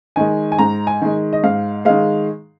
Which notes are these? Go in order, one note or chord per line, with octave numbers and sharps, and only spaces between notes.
D#3 G#3 G#5
G#5
G#2 A#5
G#5
D#3 G#3
D#5
G#2 F5
D#3 G#3 F5